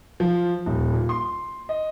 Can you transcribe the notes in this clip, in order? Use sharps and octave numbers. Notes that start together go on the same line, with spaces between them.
F3
D#1
A#2
C6
D#5